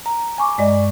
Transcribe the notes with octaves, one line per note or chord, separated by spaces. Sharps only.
A#5
G#5 C#6 D6
G2 G#3 D5 D#5